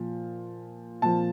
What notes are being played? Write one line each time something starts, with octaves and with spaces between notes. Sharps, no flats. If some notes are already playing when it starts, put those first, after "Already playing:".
Already playing: A#2 F3
A#2 F3 A5